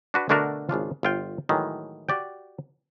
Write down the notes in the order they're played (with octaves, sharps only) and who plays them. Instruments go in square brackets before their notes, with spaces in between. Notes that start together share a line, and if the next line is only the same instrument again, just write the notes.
[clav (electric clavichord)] D4 F#4 B4
B2 D3 A3 D4 F#4 A#4
G#1 C#3 D4 F4
G1 F4 G5
A2 D#3 E3 F#3 G#3
F#4 G4 D5 G5